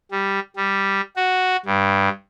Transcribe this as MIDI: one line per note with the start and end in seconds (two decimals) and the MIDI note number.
0.12 0.40 55
0.57 1.01 55
1.16 1.56 66
1.66 2.09 43